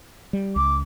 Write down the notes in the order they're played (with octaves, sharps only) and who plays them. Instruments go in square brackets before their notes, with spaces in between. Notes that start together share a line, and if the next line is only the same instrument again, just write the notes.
[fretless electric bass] G3
[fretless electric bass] C#2 [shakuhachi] D6